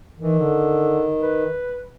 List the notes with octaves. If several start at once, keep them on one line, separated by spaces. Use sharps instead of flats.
D#3 E3
D3
B4